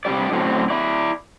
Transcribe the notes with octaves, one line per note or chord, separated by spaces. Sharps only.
C3 G3 D4 G4 D5
F#2 A2 D3 C4
E4 D5